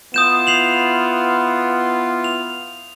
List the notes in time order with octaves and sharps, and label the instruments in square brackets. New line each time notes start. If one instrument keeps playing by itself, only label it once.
[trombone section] B3 E4 F4 [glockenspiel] D#6 G6 E7
[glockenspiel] C7 F7 F#7
F7